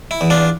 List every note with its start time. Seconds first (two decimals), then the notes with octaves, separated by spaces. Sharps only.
0.11 E4
0.21 E2
0.30 D4 F4